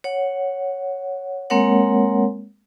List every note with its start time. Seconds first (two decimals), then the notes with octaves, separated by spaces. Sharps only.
0.04 C#5 F#5
1.50 G#3 A#3 C4 A#4 C#5 F#5